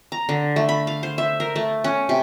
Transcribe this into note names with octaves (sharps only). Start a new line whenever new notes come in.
A#5
D3
A3
B5
F5
C5
E5
A#4
A3
C#4
C3